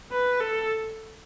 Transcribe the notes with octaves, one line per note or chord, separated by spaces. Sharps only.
B4
A4